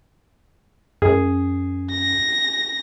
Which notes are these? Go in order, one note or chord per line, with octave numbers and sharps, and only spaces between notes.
F#2 G#4
A#6